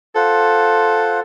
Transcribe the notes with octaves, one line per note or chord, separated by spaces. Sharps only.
F4 A4 C5 F#5